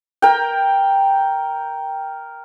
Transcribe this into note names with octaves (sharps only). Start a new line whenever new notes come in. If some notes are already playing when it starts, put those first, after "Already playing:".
A#4 G5